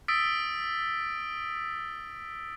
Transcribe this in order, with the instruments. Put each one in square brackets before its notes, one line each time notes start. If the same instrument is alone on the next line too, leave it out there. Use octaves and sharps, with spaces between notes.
[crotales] D#6 E6 A6 B6 D7